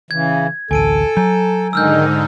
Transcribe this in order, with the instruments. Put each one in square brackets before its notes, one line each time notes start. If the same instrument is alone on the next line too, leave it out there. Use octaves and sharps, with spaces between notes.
[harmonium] C#3 E3 [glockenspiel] G#6
[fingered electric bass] A1 D2 [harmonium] A4 [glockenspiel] G#5 D7 D#7
[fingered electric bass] F#3 [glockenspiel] G#5 A#5 G6
[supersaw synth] G#2 D3 D#4 [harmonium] D#3 G#3 [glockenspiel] E6 F6 G6